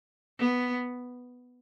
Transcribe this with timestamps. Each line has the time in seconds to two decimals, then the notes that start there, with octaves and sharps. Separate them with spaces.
0.39 B3